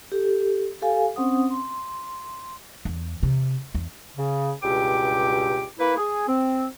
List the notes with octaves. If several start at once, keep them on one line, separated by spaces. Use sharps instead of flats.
G4 A4
G4 A4 F5 G#5
C4 C#4 C5 F#5 D#6
C6
E2
C3
E2
C#3
C#2 G2 B2 G4 G5 D6
A#3 E4 B4
G#4
C4